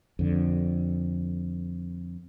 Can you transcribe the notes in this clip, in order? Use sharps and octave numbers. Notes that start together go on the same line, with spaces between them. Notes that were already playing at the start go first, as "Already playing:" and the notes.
F2 D3